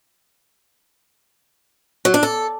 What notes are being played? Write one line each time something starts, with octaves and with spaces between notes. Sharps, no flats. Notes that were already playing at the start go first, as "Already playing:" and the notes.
F#3
D4
A4